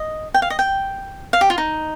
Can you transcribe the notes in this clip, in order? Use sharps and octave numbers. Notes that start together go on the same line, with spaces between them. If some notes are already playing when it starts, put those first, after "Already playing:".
Already playing: D#5
G5
F5
D#5
G5
F5
G4
F4
D#4